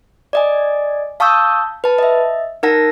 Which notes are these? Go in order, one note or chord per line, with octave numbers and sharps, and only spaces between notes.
D5 D#5 G#5
F5 A5 C#6 D#6 E6 G6
B4 A5
D#5 E5
D#4 A#4 F#5 A5 A#6